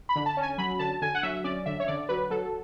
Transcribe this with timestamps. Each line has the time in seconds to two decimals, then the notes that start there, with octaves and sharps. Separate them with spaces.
0.09 B5
0.16 D3
0.26 A5
0.37 C#4
0.43 G#5
0.58 F#3 B5
0.79 D3 A5
1.02 D3 G#5
1.15 F#5
1.23 F#3 E5
1.44 C#4 D5
1.66 D3 E5
1.80 C#5
1.87 D3 D5
2.09 F#3 B4
2.30 F#3 A4